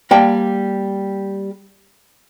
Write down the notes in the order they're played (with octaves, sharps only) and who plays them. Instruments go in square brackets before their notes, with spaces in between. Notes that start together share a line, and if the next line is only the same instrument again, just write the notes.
[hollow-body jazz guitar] G3 A#3 G5 A5